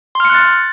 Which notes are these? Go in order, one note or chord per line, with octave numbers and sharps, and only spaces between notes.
C6 F6 F#6 A6 C#7